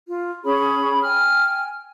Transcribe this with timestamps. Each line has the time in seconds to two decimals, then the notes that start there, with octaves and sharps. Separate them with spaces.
0.07 F4
0.45 C#4 G#4 C#5 B5
1.02 G5 G#5 F6